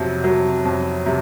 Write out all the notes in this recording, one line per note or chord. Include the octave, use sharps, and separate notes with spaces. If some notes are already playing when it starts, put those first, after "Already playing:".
Already playing: F2 C3 F#3
C3 F#3
F2
C3